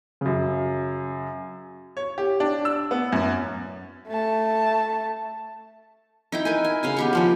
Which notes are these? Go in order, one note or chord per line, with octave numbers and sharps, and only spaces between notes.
F#2 C#3
C#5
G4
D4
E6
B3
F#2
A3 A5
D#4 E4 G5
A#4 B4 G#5
G#5
C#3 F5 G#5
B3 G4 C#6
C#3 F3 A#3